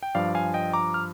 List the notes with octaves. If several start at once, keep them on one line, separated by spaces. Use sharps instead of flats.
G5
G2 F3 D5 F5
F5 G#5
D#5 G5
A#5 D6
F6